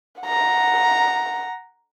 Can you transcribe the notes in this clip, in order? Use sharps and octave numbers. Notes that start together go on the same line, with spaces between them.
F#5 A#5